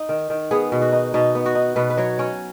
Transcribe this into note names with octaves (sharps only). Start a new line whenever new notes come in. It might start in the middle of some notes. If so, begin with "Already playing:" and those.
Already playing: D#4
D#3
D#3
B3 G#4
B2
F#4
D#4
B2 D#4
B3
F#4
D#4
B2 B4
B4
F#3 C#5
C#4 C#5